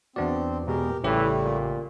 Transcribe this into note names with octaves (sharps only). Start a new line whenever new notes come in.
E2 B3 C4 D4 F#4 D5
B2 G#3 G4 G#4 A#4
A1 C#3 E3 G3 A3 G4 C#5 E5
A#2